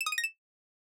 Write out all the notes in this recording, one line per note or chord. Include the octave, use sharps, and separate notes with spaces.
E7
D#6
D#7
A#6
E7